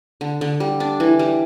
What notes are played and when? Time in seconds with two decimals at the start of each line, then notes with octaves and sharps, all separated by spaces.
0.21 D3
0.41 D3
0.60 G3
0.80 D4
1.00 E3
1.19 G3